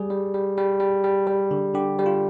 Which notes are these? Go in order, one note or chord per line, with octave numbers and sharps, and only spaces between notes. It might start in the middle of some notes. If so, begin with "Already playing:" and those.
Already playing: G3 G#4
G3
G3
G3
G3
G3
G3
D3
D3 G4
G3
F4